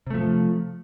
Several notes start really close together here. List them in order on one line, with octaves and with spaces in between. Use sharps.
C3 A3 F3